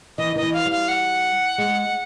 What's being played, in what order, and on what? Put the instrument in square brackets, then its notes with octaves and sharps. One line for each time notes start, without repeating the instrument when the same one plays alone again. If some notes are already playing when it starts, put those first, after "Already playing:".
[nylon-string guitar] E3 [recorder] D#5
[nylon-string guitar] D#3 [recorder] D#5
[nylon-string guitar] E3
[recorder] F5
[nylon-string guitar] G3
[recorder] F5
F#5
[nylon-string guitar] G#3